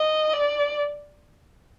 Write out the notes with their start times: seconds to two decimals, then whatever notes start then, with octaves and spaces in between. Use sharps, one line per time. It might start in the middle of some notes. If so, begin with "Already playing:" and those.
Already playing: D#5
0.33 D5